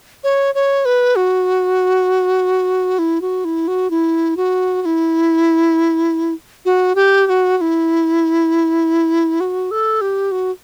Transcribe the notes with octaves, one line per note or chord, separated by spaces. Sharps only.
C#5
C#5
B4
F#4
E4
F#4
E4
F#4
E4
F#4
F#4
E4
F#4
G4
G4
F#4
F#4
E4
F#4
A4
G4
F#4